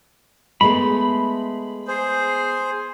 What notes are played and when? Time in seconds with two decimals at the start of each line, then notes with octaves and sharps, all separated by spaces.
0.61 G#3 A3 B3 B5
1.88 G#4 C5